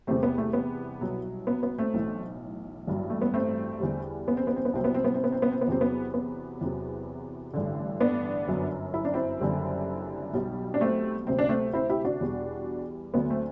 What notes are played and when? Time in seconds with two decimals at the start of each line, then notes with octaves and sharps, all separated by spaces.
0.07 E2 C3 G3 A3 C4
0.23 B3
0.38 A3
0.53 B3
1.01 C2 B2 F#3
1.47 B3
1.63 B3
1.78 A3 C4
1.94 B1 A2 E3
2.87 A1 G2 F#3
3.10 A3
3.21 B3
3.34 A3 C4
3.80 E2 D3 G3
4.28 B3
4.37 C4
4.47 B3
4.56 C4
4.65 B3
4.73 C2 C3 F#3 C4
4.84 B3
4.94 C4
5.04 B3
5.14 C4
5.24 B3
5.32 C4
5.42 B3
5.52 C4
5.61 B3
5.68 E2 C3 F#3 C4
5.81 B3
6.14 B3
6.61 E2 C3 F#3
7.54 A1 G2 D3
8.00 B3 D4
8.48 G1 F#2 F#3
8.94 E4
9.05 D4
9.14 C4 E4
9.41 F#1 F#2 D3 G3
10.33 B1 B2 G3
10.74 D4
10.81 A3 C4
11.27 D2 C3 F#3 C4
11.39 D4
11.49 A3 C4
11.73 C4 E4
11.90 E4 G4
12.05 D4 F#4
12.21 E2 B2 G3
13.14 D2 D3 F#3 B3
13.30 A3 C4